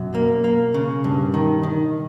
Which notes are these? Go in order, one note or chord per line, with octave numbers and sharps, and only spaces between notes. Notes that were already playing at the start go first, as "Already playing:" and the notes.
Already playing: F#2 B2
A#3
A#3
C#3
G2
D#3
D#3